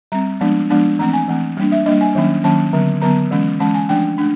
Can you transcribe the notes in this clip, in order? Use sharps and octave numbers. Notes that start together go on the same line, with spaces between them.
G3 C4 A#5
F3 G#3 B3 D4
F3 G#3 B3 D4
E3 A3 C4 A#5
G#5
E3 A3 C4
G3 A#3 D4
E5
G3 A#3 D4 D#5
G#5
D#3 F#3 A#3 C#4
D#3 F#3 A#3 C#4 A5
D3 F#3 B3
D3 F#3 B3 A#5
E3 G#3 C#4
E3 G#3 C#4 A5
G#5
F3 A3 D4 G5
A3 D4